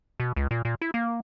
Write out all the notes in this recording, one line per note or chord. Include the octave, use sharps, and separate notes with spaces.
B2
C#2
A#2
A#2
E4
A#3